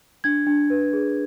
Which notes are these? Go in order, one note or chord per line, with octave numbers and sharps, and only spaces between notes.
D4 G#6
D4
B4
G#4